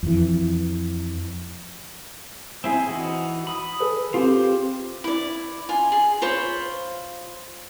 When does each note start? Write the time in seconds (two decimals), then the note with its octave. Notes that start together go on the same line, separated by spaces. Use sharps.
0.03 F2 E3
2.64 C4 E4 G#4
2.89 E3 D#4 F#4
3.47 B5 D#6
3.80 G#4 A4 B4
4.14 C4 F4 G4 C5
5.04 E4 D5
5.69 F4 G#5
5.92 G#4
6.22 F4 C5 C#5 B5